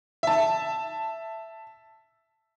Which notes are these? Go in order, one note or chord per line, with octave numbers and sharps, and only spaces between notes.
E5 A5